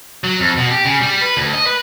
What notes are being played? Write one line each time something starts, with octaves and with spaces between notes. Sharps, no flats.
F#3
F2
B2
G4
C#3
G3
B4
D2
D#5
B4